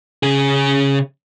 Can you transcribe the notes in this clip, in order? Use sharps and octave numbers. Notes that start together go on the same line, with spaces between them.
C#3 G#4